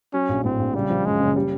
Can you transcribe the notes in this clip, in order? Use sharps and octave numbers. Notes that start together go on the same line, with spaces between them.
F#3 C#4
A#1
A2 C4
A#1
C#3 G3
F3
F#2 G#3
F#1
G3